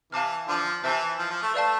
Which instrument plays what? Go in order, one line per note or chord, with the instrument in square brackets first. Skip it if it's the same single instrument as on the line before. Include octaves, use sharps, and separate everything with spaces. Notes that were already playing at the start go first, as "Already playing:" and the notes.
[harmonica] C3 E3 [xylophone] F5 A5 D6 F6
[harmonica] D3 F3
[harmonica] C3 E3 [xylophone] C5 E5 A5 E6 G6
[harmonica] F3
F3
A3
[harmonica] A3 [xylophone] B4 D5 F5 A5